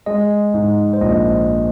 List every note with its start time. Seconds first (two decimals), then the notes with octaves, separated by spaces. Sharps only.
0.06 G#3 D#5
0.54 G#2
0.93 C5
1.01 A#1 D#5